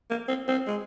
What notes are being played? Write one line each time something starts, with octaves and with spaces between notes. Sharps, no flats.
A#3
C4
C4
G#3